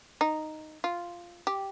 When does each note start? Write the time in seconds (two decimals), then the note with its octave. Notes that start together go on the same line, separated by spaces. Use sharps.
0.21 D#4
0.84 F4
1.47 G4